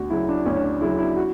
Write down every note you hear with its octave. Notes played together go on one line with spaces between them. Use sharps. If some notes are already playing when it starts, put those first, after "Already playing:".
Already playing: D2 F#4
C#3 F#3 E4
D4
D2 C#4
D4
C#4
C#3 F#3 E4
E4
F#4